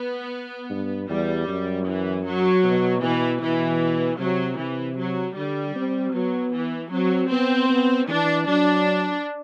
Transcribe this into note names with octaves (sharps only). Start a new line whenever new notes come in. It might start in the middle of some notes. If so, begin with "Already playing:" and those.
Already playing: B3
G2
E2 G3
F#2
E3
F#3
B2
B2 E3
B2 E3
C3 F#3
C3 E3
F#3
D3 G3
C4
F#3 B3
E3
F#3 C4
B3 C4
B3
E3 D4
F#3 D4